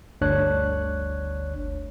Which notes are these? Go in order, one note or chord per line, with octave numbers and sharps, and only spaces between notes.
G1 D2 D4 C#5 F#6